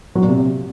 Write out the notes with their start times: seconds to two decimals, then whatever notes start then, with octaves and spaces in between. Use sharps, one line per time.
0.15 F#3
0.22 A#2
0.29 C3